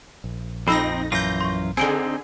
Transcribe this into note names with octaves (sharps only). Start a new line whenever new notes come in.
A#1
F2 C4 D#4 B5 E6 A#6
F#2 E3 F4 G6 A#6
C6 C#6
D3 C4 D#4 G#4 G#5 D7 G7